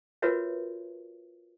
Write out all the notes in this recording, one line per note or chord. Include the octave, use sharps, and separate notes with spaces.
F4 F#4 A#4 B4 C#5 E5